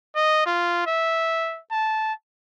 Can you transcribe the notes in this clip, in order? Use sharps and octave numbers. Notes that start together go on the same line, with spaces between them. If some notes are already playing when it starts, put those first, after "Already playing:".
D#5
F4
E5
A5